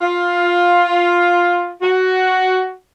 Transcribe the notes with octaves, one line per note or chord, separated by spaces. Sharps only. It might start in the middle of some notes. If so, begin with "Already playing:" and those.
F4
F#4